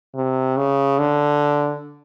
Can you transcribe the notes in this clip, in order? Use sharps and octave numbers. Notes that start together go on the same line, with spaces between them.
C3
C#3
D3